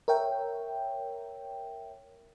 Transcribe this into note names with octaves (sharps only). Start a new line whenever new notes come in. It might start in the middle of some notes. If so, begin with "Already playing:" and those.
A#4 C#5 E5 G5